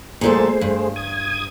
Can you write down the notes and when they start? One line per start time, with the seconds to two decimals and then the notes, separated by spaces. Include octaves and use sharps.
0.21 A#2 G3 A3 G#4 A4 C5
0.61 G2
0.96 D#6 G#6